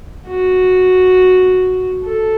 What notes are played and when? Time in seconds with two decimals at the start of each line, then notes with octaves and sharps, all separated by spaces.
0.27 F#4
2.04 A4